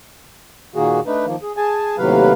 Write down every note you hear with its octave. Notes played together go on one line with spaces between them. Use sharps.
A#2 D#3 A#3 F#4 G#4
A3 D4 D#4 B4
D#3 F3 A#3
G#4
G#4 G#5 A5
D#2 A2 C3 F#3 B4 F5